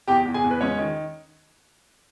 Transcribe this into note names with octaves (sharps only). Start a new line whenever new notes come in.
E2 G4 G5
E2
G#4 G#5
E2
B4
G#3 C#4 C#5
D#3